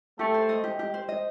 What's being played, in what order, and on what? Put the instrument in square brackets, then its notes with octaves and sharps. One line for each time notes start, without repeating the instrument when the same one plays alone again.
[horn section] A3 A4 [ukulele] G4
[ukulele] C5
D#5
G4
G4
C5
D#5